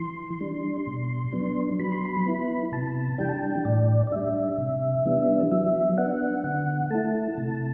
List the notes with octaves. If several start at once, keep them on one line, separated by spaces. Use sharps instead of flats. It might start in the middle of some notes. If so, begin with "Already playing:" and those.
Already playing: E3 C6
G3 D4
B2
F#3 B3 D4
F#3 B5
C6
B5
B3 E4
C3 A5
E3 G3 D4 G5
A5
G5
A2 D5
D5
G3 D4 E5
C3
E3 G3 B3 D4
F#3 E5
B3 D4 F#5
D3 F#5
A3 E4 A5
C3